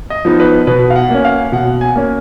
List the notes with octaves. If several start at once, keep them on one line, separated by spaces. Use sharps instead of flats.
D#5
F3 B3 D#4
B4
B2 B4
F5
F#5
A#3 C#4
F5
B2 F#5
G#5
A#3 C#4